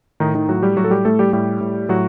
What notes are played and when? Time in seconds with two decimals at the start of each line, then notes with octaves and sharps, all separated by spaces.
0.20 A2 D#3 D#4
0.35 D#3 D#4
0.48 A2 F#3 F#4
0.62 G3 G4
0.77 A2 F#3 F#4
0.84 A4
0.91 G3 G4
1.05 A2 A3 A4
1.19 G3 G4
1.33 A2 G3 G4
1.61 A2
1.89 A2 F#3 F#4